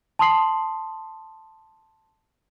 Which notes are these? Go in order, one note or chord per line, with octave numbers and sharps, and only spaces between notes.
A5 C6 D#6 C7 F#7